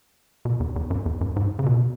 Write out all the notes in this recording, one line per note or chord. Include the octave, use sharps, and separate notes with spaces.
B2
E2
E2
F#2
E2
F#2
G#2
C#3
B2